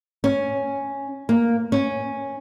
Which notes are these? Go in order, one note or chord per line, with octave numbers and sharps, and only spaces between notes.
C#4
A#3
C#4